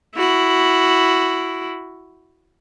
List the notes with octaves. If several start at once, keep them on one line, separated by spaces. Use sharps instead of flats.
E4 F#4